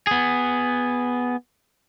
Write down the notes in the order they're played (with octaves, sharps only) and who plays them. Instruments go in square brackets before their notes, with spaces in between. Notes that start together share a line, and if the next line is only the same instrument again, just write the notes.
[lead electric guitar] B3 G#4